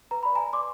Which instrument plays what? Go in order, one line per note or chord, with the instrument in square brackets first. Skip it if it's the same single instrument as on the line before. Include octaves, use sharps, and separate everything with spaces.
[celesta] B4 A#5
D5 B5
G#5 A#5
B4
D5 C6 D6